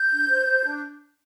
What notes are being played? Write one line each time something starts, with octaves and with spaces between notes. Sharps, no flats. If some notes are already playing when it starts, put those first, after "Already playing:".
Already playing: G6
D4
C5
C5
D4